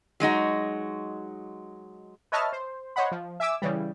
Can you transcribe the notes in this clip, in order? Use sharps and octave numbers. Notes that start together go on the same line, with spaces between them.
F#3 G#3 D#4 F#4
B4 C#5 D#5 E5 A5 F6
C5
C5 C#5 D#5 F#5 B5
F3
E5 G#5 D6 E6
C#3 E3 G3